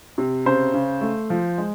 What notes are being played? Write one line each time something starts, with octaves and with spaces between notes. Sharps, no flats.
C3
C#3 C5
C#3
A3
F3
G#3